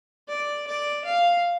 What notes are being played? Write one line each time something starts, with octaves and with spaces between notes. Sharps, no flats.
D5
D5
F5